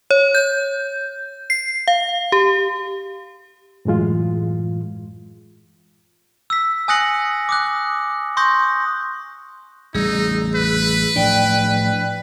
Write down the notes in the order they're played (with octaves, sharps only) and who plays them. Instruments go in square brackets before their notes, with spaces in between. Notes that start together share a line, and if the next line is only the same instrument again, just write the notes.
[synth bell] C#5
G6
C7
F5
G4
[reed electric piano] F#2 A2 E3 G#3 F4
[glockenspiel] E6 B6
G#5 D#6 F#6 A#6 C#7 F#7
D6 D#6 F#6
C6 C#6 D#6 G6 A#6
[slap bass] A1 G3 [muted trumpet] D#4 [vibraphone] G#4 E6
[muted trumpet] B4
[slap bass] A2 F3 D4 [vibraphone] D5 G5